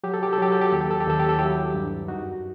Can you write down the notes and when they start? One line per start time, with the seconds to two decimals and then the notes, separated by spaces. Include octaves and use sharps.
0.04 F#3 G4
0.14 A4
0.23 G4
0.33 A4
0.38 F#3 G4
0.52 A4
0.61 G4
0.71 D#2 A4
0.81 G4
0.91 A4
1.00 G4
1.07 D#2 A4
1.20 G4
1.29 A4
1.39 F#3 E4 G4
1.74 G2
2.08 F#2 D#4 F#4